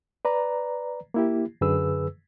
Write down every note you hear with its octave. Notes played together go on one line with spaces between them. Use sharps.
B4 D5 A#5
A#3 E4 G4
F#2 D3 G#4 B4 E6